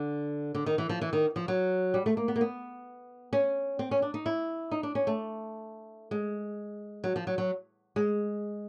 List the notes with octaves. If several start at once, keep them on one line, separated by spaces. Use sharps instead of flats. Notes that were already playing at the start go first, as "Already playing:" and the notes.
Already playing: D3
D3
D#3
E3
F3
E3
D#3
F3
F#3
G3
A3
A#3
B3
A#3
B3
C#4
C4
C#4
D4
D#4
E4
D#4
D4
C#4
A3
G#3
F#3
F3
F#3
F#3
G#3